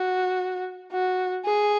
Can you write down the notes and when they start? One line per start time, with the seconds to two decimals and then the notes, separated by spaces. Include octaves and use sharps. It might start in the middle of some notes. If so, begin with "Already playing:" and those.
Already playing: F#4
0.92 F#4
1.46 G#4